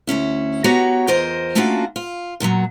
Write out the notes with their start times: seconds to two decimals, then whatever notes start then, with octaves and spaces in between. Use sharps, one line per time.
0.07 D2 G#2 C#4 E4
0.64 B3 F#4 G4 C#5 A#5
1.07 E2 F4 A#4 C5 D#5
1.55 A3 A#3 C#4 D4 F4 F#4
1.96 F4
2.40 F#2 A#2 E3 F#3